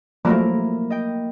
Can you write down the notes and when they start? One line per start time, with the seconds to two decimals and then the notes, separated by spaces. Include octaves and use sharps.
0.25 F3 F#3 A3 A#3 E4 A#4
0.90 D#5 G5